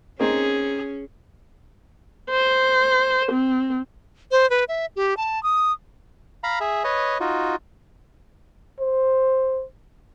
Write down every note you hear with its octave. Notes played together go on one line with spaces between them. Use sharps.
A#3 C4 C#4 D#4 G#4
C5
C4
C5
B4
E5
G4
A5
D#6
F5 A#5 B5
G#4 E5
B4 C#5 D#5
D#4 F4 F#4
C5